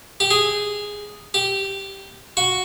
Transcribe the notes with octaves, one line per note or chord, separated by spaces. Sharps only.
G4
G#4
G4
F#4